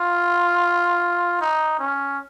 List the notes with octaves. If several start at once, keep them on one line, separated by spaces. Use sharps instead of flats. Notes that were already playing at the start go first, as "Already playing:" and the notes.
Already playing: F4
D#4
C#4